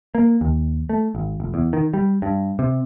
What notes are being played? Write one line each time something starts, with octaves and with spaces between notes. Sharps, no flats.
A#3
D#2
A3
G#1
F1
E2
D#3
G3
G2
C3